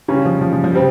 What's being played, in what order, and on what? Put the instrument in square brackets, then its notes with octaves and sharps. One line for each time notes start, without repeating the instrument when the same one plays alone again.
[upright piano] C#3 G3 C#4 [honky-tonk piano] E3
[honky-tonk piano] F3
F3
F3
F3
[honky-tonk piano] C#3 [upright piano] G3 C4